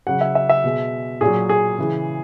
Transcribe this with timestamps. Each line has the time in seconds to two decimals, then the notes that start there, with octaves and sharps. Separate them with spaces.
0.06 C#3 F#3 F#5
0.21 E5
0.35 E5
0.49 E5
0.64 B2 G#3
1.21 A#2 F#3 G#4
1.49 G#4
1.78 C#3 E3 G#3